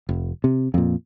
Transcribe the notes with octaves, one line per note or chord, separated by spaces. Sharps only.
F1
C3
F2 A#2